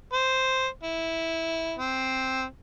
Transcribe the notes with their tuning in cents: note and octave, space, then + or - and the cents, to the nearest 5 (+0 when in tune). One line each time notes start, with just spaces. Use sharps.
C5 +0
E4 -10
C4 +0